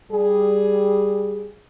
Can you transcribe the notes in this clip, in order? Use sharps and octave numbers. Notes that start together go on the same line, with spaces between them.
G3 G#4